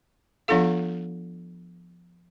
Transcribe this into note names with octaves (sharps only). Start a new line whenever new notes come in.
F3 B3 D4 F4 A4 F5